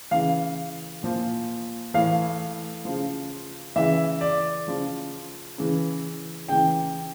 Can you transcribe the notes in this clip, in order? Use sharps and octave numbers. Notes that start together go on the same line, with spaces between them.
C#3 E3 F5
A#2 F3
A2 E3 F5
C#3 F3
C#3 E3 E5
D5
C#3 F3
C#3 E3
C#3 E3 G5